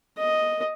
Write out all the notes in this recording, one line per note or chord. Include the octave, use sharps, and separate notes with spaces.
D#5